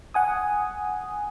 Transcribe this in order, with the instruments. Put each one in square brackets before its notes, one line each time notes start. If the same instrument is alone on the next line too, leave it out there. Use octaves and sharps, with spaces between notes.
[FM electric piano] F#5 G#5 D#6